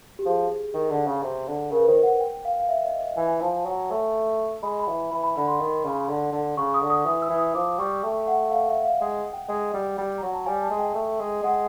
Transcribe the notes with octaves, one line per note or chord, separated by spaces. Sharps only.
G4
F3 G#4
D#3
D3
C#3
C3
D3
C#3 A#4
B4
D#3 C5
F#5
G5
F5
F5
E5
D#5
D#5
E3 G#5
F3 A5
F#3
A3
G#3 B5
B5
E3
E3 B5
B5
D3 B5
C6
D#3
C#3
D3
D3
C#3 C#6
D#6
D3
D#6
E3 D#6
E6
E3
D#6
F3 D6
G3 C#6
A3 G5
F#5
F5
E5
F5
G#3 F#5
G5
G#3
G3
G3
F#3 A#5
A5
G3 G#5
A5
G#3
G5
A3
G#3
G#3 F#5